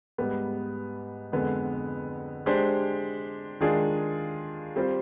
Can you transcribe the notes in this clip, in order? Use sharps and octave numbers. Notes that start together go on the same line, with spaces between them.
G#2 G3 B3
F2 D3 G#3 B3
G#3 D4 G4 C5
D#3 G#3 D4 F4 G#4
G3 C4 F4 C5